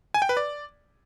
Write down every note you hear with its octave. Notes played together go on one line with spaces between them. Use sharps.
G#5
G5
B4
D5